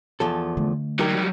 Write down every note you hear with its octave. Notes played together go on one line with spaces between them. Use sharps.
E2 F3 A4
D3 A3
F#3 G3 D#4 G4 A#4